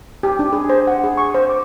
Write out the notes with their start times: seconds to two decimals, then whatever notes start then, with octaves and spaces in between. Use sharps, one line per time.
0.23 G4
0.39 D4
0.53 G#4
0.69 C5
0.87 F#5
1.04 G#4
1.17 C#6
1.34 C5
1.50 D6